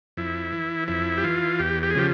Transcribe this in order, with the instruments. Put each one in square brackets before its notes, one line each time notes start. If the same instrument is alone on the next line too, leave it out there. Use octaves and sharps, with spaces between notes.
[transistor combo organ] F2 E4
E3
F2 E4
G4
E3 F4
E2 G4
G4
G#4
C#3 F3 G4